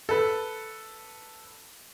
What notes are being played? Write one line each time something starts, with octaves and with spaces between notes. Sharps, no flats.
A4 B4